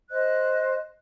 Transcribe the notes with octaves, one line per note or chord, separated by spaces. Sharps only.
C5 D#5 F#6